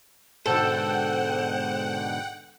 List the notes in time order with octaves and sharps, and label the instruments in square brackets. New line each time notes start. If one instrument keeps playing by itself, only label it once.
[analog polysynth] G#2 B2 D3 [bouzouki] A4 [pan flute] C5 [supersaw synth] F#5 G5